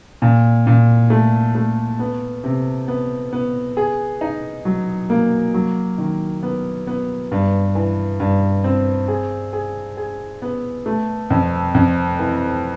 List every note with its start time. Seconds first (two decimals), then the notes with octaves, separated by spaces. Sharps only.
0.22 A#2
0.67 A#2
1.10 A3
1.55 A3
1.99 B3
2.44 C3
2.88 B3
3.33 B3
3.77 G#4
4.21 D#4
4.65 F#3
5.10 A#3
5.54 F#3
5.98 D#3
6.43 B3
6.87 B3
7.32 G2
7.75 E3
8.20 G2
8.64 C4
9.08 G#4
9.53 G#4
9.97 G#4
10.42 B3
10.86 A3
11.30 F2
11.75 F2
12.19 E3